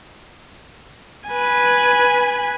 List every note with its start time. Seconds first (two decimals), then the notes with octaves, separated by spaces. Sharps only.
1.29 B4 G#5